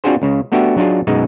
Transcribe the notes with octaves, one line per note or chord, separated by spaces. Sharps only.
C4 D4 F4 F#4 G#4 C5
C#2 C#3
A3 B3 D4 F#4 G4 E5
F#3 D4 D#4 F4 G#4
F#2 B2 G#3 D#4